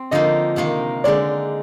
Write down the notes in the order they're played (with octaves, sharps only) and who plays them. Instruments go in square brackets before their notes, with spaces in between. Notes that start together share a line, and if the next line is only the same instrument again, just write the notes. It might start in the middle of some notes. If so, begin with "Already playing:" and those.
Already playing: [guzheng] C4
[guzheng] D3 F3 A#3 D#4 [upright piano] D#5
[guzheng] C3 D#3 A#3 D#4
[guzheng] D3 G#3 D#4 [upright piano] D5